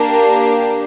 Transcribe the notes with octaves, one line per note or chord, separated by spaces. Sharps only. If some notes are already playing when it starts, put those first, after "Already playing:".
Already playing: A#3 D4 G4